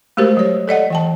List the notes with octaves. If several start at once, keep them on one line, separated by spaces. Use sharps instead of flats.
G#3 A3 F#4 G4 A#4 C5
F#3 C#5
A4 D5 D#5 F#5
E3 G5 A5